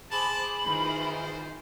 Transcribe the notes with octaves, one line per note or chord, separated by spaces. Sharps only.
G#4 C5 A5 B5 D6
D#3 E3 F4 C5